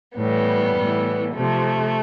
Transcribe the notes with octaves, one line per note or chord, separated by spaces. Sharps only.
A2 E3 G3 B3
A2 E3
C3 F3 A3